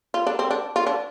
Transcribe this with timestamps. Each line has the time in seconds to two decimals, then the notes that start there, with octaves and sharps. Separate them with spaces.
0.14 F4
0.27 D4
0.39 C4
0.51 D4
0.76 F4
0.87 D4